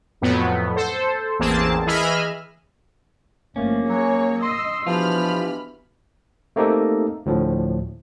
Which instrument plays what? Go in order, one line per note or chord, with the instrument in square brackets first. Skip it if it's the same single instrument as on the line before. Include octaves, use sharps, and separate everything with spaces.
[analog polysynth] F2 A2 F#3 B3
A4 C5
A1 E2 A#3 C4 G#4 A5
E3 G#4 D#5 E5 B5 F6
[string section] G1 F3 [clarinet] A3 [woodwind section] A#3 [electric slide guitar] C#4
[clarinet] F#3 [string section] G#4 C#5
[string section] D#5 E6 [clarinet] C6
[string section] B2 B5 F6 [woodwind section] E3 D4 G4 [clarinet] F3 [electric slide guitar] F4
[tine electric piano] A3 A#3 C4 D#4 G4 A4
D2 A2 F3